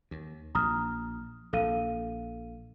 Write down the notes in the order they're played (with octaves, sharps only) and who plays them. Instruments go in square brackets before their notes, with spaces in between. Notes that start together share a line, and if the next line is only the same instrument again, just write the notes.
[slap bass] D#2
[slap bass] A#1 [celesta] A#5 D#6 F6
[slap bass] A#1 [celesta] A4 F5 D#7